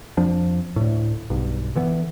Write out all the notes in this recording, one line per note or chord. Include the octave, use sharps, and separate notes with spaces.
F2 F3 D4
D2 A2
B1 G2
D3 E3 B3